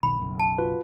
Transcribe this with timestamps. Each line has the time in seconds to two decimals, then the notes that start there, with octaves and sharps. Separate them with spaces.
0.03 E1 B1 D#3 B5
0.17 F#1 B1 F#2
0.40 A5
0.58 F4 F#4 B4